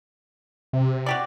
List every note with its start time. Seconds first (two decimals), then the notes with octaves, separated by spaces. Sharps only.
0.73 C3
1.06 F#4 G4 D5